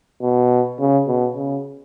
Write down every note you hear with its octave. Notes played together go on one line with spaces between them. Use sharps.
B2
C#3
B2
C#3